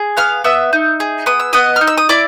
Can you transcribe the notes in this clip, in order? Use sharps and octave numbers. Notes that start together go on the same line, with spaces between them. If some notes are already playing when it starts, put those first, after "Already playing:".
Already playing: G#4
B3 F5 F6
B3 E5 E6
D#4
G#4
B3 D#6
E6
B3 D#5 D#6
F6
D#4
E6
D#6
E4 D5 D6